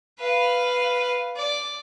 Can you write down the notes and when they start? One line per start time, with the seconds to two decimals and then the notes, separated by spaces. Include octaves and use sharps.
0.19 B4 F5
1.37 D5